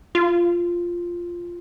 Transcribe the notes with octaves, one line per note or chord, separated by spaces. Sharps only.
F4